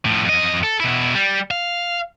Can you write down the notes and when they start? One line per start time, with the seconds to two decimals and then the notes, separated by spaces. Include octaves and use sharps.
0.05 A2 F3
0.25 F2 D#5
0.63 A4
0.80 B2 E4
1.15 G3
1.51 F5